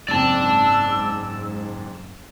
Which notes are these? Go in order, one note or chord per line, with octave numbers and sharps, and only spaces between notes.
F#1 G#2 C4 D5 A5 E6